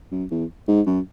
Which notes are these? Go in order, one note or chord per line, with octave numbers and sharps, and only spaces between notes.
F#2
E2
G#2
F#2